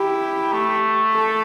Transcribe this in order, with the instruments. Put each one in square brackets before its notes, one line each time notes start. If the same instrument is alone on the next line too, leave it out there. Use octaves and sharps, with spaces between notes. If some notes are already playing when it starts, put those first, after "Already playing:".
Already playing: [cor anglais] E4 [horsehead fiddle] G4
[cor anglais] A3
[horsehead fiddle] A4